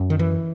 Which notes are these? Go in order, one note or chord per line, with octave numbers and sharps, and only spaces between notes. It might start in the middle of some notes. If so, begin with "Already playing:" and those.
Already playing: F#2
D#3
E3